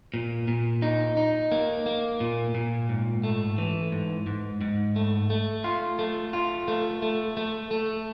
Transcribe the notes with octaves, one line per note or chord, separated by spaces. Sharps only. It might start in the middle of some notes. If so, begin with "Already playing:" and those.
A#2
A#2
D#4
D#4
A#3
A#3
A#2
A#2
G#2
A3
E3
G#2
G#2
G#2
A3
A3
F4
A3
F4
A3
A3
A3
A3